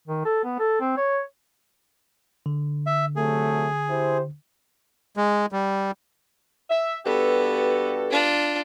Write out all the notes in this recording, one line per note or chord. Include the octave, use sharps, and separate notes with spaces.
D#3
A4
B3
A4
C4
C#5
D3
E5
C3 F#3 A3 G#4
E4 G4 C5
G#3
G3
E5
G2 B3 F#4 G4 A4
D4 F4